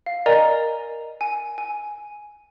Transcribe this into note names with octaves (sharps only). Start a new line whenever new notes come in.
F5
A#4 D5 D#5 G#5 A#5
G#5
G#5